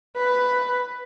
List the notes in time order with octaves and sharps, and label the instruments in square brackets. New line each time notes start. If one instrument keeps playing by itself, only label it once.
[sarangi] B4